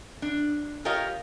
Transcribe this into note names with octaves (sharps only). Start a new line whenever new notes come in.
D4
F4 G4 A#4 C#5 D#5 F5